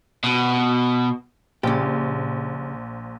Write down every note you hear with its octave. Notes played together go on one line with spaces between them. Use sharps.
B2
A#1 C#3 G4